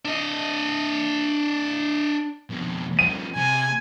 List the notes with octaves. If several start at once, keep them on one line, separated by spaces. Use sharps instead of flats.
D4 D#5
F2 B2
G2 F3 D#7
C3 G#5